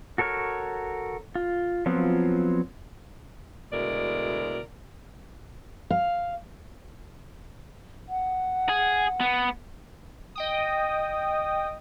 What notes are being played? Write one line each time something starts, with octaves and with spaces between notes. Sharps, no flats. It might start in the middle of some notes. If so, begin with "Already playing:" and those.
F#4 A4 A#4 C#5 F6
F4
F3 F#3 B3 C4 F4
D2 B2 G#3 E4 A#4 D5
F5
F#5
G#4
B3
D#5 G5 D#6